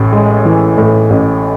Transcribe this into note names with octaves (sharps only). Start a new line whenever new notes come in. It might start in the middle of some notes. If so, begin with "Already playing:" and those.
Already playing: A1 A2
G#3
E3
A2
A1